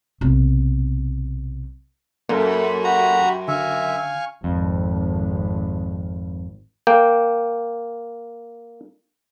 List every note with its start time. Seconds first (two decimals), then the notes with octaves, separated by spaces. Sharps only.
0.21 B1 C3
2.29 F#2 A#3 A4 A#4
2.50 B5
2.84 F#4 G4 A#5 B5
3.48 D3 E5 F5 G#5 C#6
4.44 G#1 F2
6.87 A#3 G5